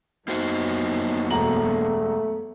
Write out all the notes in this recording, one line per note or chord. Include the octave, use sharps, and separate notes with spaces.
F#2 A#3 B3 D#4 F#4 C5
E1 A3 A#5 F#7